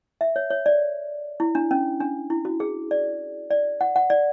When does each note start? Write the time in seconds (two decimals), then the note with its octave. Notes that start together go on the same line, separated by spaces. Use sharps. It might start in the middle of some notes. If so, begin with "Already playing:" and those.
0.21 E5
0.36 C#5
0.50 C#5
0.66 D5
1.40 E4
1.55 D4
1.71 C#4
2.00 D4
2.30 E4
2.45 F#4
2.60 G#4
2.91 D5
3.51 D5
3.81 F#5
3.96 F#5
4.10 D5